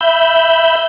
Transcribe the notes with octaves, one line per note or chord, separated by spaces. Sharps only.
E5 B5 G6